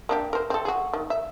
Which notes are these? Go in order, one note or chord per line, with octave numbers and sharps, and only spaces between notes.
A#3 D4 G4
A#4 C5
C4 A4
F#4 G#4
D#3
E5